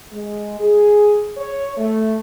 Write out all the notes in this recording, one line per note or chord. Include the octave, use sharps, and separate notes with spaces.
G#3
G#4
C#5
A3